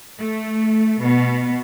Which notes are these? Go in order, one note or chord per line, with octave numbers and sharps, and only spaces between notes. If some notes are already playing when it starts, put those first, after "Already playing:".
A3
B2